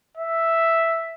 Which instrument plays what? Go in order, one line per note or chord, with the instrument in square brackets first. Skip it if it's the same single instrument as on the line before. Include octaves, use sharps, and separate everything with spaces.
[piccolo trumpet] E5